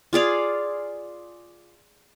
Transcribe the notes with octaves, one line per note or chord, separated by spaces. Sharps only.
F4 G#4 D5 F5